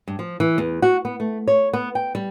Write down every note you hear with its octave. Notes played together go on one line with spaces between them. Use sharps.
G2
F3
E3
E2
F#4
B3
A3
C#5
B3
G5
G3